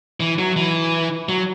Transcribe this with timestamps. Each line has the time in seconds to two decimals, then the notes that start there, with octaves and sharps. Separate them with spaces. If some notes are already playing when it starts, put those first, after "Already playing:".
0.20 E3
0.39 F#3
0.56 E3
1.29 F#3